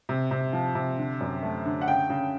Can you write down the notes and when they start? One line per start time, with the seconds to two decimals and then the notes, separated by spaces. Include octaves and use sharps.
0.09 C3
0.31 C3
0.53 F3
0.75 C3
0.98 D3
1.21 F#2
1.43 A3
1.65 D3
1.81 F#5
1.87 C#3 G5
2.10 C#3